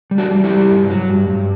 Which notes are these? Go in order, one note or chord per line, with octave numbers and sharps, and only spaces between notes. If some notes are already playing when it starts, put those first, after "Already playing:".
G3
D4 F#4
G3
E4 G4
G3
G2
F#3
G2
G2